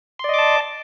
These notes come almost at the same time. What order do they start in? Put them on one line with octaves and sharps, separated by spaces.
C6 D5 D#5 D6 A5